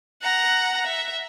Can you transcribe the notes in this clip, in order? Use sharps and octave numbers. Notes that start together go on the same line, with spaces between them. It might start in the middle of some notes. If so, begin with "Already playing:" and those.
F#5 A#5
E5